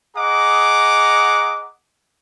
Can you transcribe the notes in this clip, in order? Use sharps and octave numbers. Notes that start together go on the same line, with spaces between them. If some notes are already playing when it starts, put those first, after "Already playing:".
G#4 D#5 F#5 A#5 D6